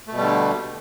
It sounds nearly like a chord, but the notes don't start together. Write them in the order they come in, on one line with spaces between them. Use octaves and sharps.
A3 B2 G3 D3